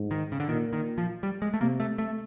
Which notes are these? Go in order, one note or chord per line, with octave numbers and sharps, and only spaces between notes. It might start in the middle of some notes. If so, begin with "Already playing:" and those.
Already playing: G#2
D#3
C#3
D3
A#2 D#3
D#3
F3
G3
G#3
A3
C3 A#3
A3
A3